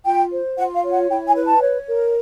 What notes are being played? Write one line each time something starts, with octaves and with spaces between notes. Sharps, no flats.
F4 G5
C5
F4 F#5
F5
C#5
F#5
E4 G5
G#5
B4
A5
C#5
A#4